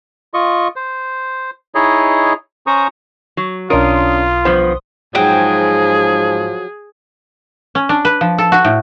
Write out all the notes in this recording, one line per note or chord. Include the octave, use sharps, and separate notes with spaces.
F4 D#5 C#6
C5
D#4 E4 G#4 C#5 D#5
C#4 C5 A#5 C#6 D#6
F#3
B1 C#4 D4 F4 A#4 C6 D#6
G2 F3 B3 C5
G#2 F3 F#3 G#4 G5
C#4
D4
B4
F3
A4
F#4
A2